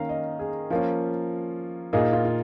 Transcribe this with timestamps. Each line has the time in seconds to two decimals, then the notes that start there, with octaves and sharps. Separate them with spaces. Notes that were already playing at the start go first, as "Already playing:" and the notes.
Already playing: D#3 A#3 C#4 F5 A#5
0.09 D#5
0.39 G#4
0.70 F3 A#3 C#4 F4
1.93 A#2 A#3 D#4 G#4
2.13 F4
2.25 F4